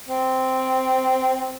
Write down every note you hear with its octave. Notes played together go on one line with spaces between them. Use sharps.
C4